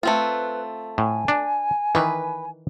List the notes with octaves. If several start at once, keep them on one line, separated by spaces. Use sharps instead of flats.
A3 C4 F4 B4
A2 G#5
D4
D#3 E3 B4